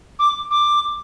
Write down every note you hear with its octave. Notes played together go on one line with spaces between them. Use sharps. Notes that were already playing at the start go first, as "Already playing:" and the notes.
D6
D6